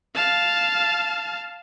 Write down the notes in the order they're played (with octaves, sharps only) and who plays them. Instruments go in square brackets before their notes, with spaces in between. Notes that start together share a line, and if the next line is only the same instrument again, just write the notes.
[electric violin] F5 A5